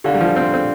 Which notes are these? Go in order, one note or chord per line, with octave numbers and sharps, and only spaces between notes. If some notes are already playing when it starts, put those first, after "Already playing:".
D3 D4 G4 D5 F5
G3
F3
C4
C4